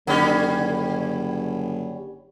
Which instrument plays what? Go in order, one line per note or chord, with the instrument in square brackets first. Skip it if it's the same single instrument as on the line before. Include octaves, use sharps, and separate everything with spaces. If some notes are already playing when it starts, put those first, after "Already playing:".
[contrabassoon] F#1 [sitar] D3 G3 C#4